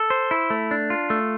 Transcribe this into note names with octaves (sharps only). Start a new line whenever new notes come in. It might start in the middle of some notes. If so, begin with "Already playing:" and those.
Already playing: A4
C5
E4
A3
D4
F4
A3